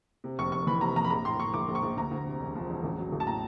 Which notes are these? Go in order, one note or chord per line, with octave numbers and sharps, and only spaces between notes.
C3
F1 C#6
F1 C#6
E3 B5
C3 A#5
F2 A#5
B5
A#1 A#5
A2 C6
A2 C#6
A#1 D6
A#1
C#6
A#1
D2 A#5
D2
C3
E1
F3
E1
A1
F#3
A1
A5
A2 A#5